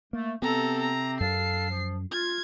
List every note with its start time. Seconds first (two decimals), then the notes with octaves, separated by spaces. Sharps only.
0.13 A3 A#3
0.42 C3 B3 C4 A4 A#5
0.80 A#5
1.20 F#2 A4 F5 A5 C7
1.69 F3
2.12 F4 G#6